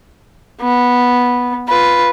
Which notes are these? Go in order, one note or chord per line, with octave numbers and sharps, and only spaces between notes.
B3
F4 B4